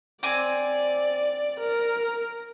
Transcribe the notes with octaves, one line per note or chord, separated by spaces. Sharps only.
C4 D5 G#5 D6
A#4